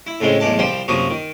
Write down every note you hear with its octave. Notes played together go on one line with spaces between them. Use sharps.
E4
A2 C#3 G#3 C4
B1 E2 A2 G#3 D5 A5
C2 F3 G3 C5 G5 C6
F#2 C3 F3 A#3 C#6 D#6
D#3